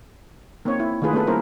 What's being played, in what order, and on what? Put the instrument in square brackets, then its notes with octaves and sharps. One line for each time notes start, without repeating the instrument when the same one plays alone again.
[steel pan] A#3 C4 C#4 D#4 C#5
E4
D#3 A3 F4 G#4 B4
A3 B3 C#4 G#4 A4 B4
G3 A#3 C#4 E4 A#4 C5